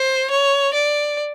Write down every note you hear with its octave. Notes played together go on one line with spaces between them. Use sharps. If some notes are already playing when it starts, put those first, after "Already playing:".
Already playing: C5
C#5
D5